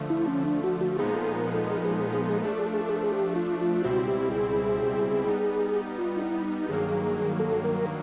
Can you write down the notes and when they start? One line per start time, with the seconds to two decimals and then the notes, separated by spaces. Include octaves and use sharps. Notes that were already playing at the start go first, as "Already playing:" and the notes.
Already playing: D3 F3 A3
0.10 E4
0.27 C#4
0.45 D4
0.64 F#4
0.81 F#4
0.99 A#2 F3 G#3 B3 D#4 G#4
1.16 A4
1.34 A#4
1.52 A4
1.70 G#4
1.78 A4
1.85 G#4
1.92 A4
2.00 G#4
2.07 A4
2.14 G#4
2.23 A4
2.30 G#4
2.36 A4
2.41 F3 A3 D4 G#4
2.52 A4
2.59 G#4
2.67 A4
2.74 G#4
2.81 A4
2.89 G#4
2.96 A4
3.04 G#4
3.12 G4
3.36 F4
3.61 F4
3.84 C#2 B2 G3 C4 E4 F#4
4.08 G4
4.31 G#4
5.27 G3 B3 D#4
5.98 F4
6.16 D#4
6.21 E4
6.45 D#4
6.69 G2 D#3 F#3 A#3 G#4
7.40 A4
7.64 A#4